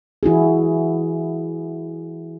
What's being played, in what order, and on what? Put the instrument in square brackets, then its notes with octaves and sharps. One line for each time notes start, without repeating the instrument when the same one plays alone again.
[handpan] E3 E4 F#4 G#4